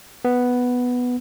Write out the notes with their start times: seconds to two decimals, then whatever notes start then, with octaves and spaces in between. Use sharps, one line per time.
0.25 B3